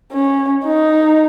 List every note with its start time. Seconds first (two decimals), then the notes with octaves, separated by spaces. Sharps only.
0.12 C#4
0.65 D#4